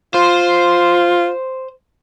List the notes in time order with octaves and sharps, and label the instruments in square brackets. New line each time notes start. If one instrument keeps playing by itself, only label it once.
[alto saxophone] F4 [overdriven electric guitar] C5